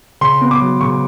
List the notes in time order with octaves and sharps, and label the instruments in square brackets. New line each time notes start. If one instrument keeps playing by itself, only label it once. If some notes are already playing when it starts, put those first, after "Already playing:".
[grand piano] C#3 C6
B3
D6
F#3
C#3 C#6